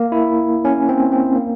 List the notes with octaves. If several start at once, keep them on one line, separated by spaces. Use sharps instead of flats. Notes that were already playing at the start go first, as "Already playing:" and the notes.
Already playing: A#3
E4
C#4
C4
C4
A#3